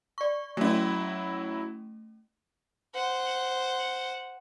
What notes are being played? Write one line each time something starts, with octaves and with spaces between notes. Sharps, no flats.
D5 C#6
F#3 A3 C#4 E4
C5 F#5